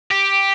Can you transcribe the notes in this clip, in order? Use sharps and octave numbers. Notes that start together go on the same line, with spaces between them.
G4